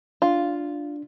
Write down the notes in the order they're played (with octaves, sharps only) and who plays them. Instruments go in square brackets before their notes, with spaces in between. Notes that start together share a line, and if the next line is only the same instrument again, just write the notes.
[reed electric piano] D4 [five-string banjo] F4